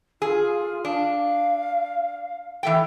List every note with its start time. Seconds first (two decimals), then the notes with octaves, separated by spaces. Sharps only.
0.22 F4 G#4
0.85 D4 F5
2.63 E3 A3 G5